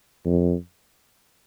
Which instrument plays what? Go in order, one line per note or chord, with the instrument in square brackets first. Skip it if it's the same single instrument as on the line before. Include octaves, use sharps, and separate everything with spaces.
[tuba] F2